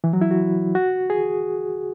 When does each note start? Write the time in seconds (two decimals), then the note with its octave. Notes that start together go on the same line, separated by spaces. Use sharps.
0.04 E3
0.13 F#3
0.21 E4
0.31 F#4
0.75 F#4
1.10 G#4